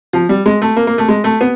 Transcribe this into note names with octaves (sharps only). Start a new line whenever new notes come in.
F3
G3
G#3
A3
A#3
A#3
A3
G#3
A3
B3